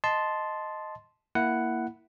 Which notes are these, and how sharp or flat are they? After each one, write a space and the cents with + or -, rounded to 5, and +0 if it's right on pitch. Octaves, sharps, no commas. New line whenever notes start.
D#5 +0 A5 -5 C6 +0
A#3 +0 E4 +0 F#5 +5